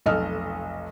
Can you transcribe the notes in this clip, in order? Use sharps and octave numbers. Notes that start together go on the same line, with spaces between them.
F1 B1 A4 D#5 F6